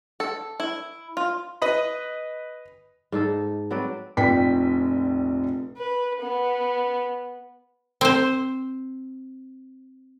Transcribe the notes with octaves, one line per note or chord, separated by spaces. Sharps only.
A4
E4
F4
B4 D#5 B5
G#2 D#4 A4
F#3 C4 B4 D5
F1 A#1 G5 B6
B4
B3
C4 C5